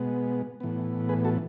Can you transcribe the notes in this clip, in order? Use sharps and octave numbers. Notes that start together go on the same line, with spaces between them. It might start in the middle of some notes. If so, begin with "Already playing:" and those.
Already playing: B2 G#3 B3
A2 E3 B3
G#4 B4
F#4 A4